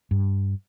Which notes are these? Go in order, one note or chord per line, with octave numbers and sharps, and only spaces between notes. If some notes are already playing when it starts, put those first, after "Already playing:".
G2